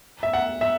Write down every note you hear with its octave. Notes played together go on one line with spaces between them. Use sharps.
E5
F#5
E5